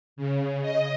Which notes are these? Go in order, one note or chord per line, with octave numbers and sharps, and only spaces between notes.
C#3
D#5